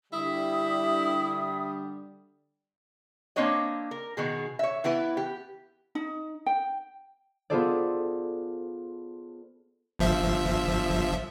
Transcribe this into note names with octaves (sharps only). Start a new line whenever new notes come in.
D3 G3 E4 E5 D#6
A#3 C4 D4 C#5 D#5
A#4
B2 D#3 G#4
C#5 E5
E3 B3 E4 B4
G4
D#4
G5
B3 F4 G#4 A4 C5 D5
G1 F3 E5